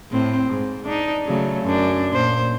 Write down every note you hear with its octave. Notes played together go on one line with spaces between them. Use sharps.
A2 C4
G#2
D4 D#4
C#3 F#3 A3
F#2 D4
A#2 C5